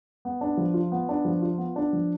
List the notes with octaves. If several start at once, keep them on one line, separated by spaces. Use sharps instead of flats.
B3
D4
F3
F4
B3
D4
F3
F4
B3
D4
F3